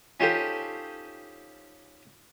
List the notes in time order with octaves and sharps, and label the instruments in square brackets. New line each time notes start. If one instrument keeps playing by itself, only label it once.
[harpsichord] C#4 D#4 F4 G4 A4 C5